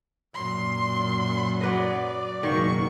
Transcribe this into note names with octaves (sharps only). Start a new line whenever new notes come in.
F#2 A#2 C6
F#3 B4 D5 D#5
F#1 B1 D#3 A#3 C#6